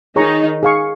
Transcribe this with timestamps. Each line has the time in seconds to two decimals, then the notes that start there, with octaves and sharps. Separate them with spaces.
0.16 D#3 D#4 G#4 C#5 A#5 C#6
0.63 G#4 F5 C#6